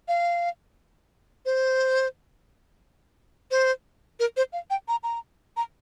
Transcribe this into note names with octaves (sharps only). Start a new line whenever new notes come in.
F5
C5
C5
A#4
C5
F5
G5
A#5
A#5
A#5